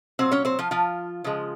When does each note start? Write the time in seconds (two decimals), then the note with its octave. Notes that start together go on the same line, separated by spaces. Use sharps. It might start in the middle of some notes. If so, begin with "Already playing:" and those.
0.19 A#2 F#3 C4 C5
0.32 C#4 C#5
0.45 C4 C5
0.59 F3 F4
0.71 F3 F4
1.24 C#3 F3 G#3